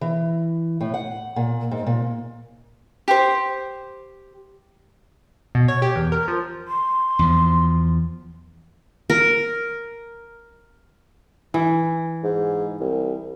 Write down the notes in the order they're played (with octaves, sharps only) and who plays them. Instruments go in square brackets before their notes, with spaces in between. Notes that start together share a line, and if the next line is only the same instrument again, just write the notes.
[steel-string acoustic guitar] E3
A2
F#5
A#2
G#2
A#2
[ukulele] G4 C5
[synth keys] B2
C#5
G4
E2
A#4
F3
[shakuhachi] C6
[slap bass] E2 F3
[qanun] A#4
[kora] E3
[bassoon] G#2
C2